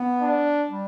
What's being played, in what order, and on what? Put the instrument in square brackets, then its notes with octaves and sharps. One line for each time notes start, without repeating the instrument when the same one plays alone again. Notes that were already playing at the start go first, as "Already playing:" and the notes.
Already playing: [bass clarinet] B3
[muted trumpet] D4
[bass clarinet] G3